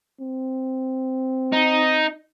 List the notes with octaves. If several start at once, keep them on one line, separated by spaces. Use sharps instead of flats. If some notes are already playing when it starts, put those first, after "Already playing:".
C4
D#4